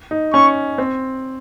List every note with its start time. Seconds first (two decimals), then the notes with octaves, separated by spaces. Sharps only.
0.11 D#4
0.33 C#4 C#6
0.78 C4